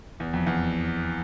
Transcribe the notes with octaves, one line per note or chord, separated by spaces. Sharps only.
E2
F2
E2